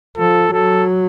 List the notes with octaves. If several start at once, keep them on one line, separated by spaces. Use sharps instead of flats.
F3 A4
F#3 A4